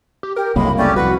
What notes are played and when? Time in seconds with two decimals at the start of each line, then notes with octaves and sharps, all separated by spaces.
0.23 G4
0.36 G4 A#4
0.56 F#1 C2 A2 F#3 G#3 A#3 B5
0.78 A3 C#4 G4 D5
0.96 C2 F2 F#4 B4 F#5